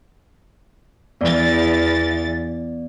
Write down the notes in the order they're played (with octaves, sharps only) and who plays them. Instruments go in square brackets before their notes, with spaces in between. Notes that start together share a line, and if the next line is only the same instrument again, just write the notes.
[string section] E2 A6 [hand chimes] B3 D5